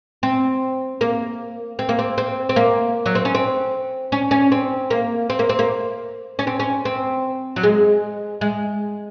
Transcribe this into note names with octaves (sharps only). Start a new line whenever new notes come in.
C4
A#3
C4
A#3
C4
C4
C4
A#3
F#3
C4
C#4
C4
C#4
C#4
C4
A#3
C4
A#3
C4
A#3
C#4
C4
C#4
C4
F#3
G#3
G#3